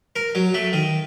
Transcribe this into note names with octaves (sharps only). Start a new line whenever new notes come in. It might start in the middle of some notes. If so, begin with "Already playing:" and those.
A#4
F#3
A3
D#3